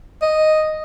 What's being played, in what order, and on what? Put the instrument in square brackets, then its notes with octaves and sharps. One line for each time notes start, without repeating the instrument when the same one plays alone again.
[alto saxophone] D#5